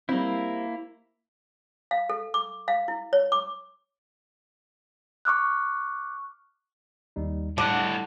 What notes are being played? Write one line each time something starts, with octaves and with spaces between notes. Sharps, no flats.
G3 A#3 C4 E4
F5
A4
D6
F5
E4
C#5
D6
C#6 D6 F6 F#6
D#2 G3 D#4
A2 D3 G3 F#5